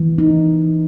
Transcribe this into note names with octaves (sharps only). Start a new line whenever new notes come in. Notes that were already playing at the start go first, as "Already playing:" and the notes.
Already playing: E3
D#4